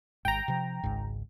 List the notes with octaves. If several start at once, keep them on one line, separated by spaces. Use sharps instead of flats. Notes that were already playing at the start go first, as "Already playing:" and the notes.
G#1 G#2 G5 A#5
C3 F3
G#1 C#2 G#2